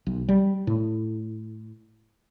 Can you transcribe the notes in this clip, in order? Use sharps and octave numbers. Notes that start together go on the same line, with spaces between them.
B1
G3
A2